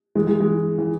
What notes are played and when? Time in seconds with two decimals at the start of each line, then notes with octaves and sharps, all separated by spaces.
0.15 E3 G#3
0.27 E3 G#3
0.40 E3 G#3
0.78 E3